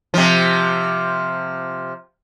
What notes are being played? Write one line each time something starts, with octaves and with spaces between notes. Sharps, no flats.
C3 F3